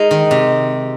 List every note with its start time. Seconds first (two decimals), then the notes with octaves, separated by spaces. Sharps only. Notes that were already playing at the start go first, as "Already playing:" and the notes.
Already playing: G#3 D#4 G#4 A#4
0.11 D#3
0.31 C3